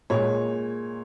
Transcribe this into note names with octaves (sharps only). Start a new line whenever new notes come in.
A#2 G#3 C#5